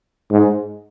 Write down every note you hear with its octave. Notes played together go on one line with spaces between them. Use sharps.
G#2